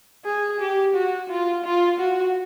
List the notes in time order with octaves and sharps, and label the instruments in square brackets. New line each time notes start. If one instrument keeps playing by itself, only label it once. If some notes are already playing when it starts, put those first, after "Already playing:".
[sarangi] G#4
G4
F#4
F4
F4
F#4